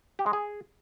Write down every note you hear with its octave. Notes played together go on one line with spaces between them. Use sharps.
G4
G#3
G#4